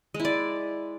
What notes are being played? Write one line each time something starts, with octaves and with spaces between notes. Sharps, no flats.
G#3
E4
D5